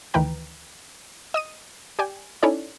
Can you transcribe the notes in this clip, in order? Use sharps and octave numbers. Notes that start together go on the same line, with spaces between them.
D2 D#3 E3 B4 G5 A#5
D#5 D#6 D#7
G4 D5 G5 G#5
C#4 D#4 E4 A4 C#5 D5